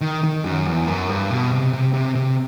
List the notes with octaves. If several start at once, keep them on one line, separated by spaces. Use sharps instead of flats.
D#3
D#3
F#2
E2
F#2
G2
B2
C3
C3
C3
C3